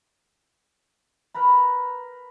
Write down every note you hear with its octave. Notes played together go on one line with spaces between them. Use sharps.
A#4 B4 A#5 B5